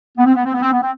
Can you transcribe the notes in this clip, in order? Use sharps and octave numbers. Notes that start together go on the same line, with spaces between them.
B3
C4
B3
C4
B3
C4
B3
C4